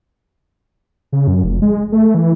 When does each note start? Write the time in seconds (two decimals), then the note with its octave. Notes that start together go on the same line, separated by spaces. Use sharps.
1.12 C#3
1.27 F#2
1.44 F1
1.62 G#3
1.92 A3
2.14 E3